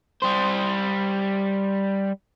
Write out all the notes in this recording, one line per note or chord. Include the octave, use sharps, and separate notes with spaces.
G3 C5